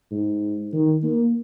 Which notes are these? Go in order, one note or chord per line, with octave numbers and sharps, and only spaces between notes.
G#2
D#3
A#3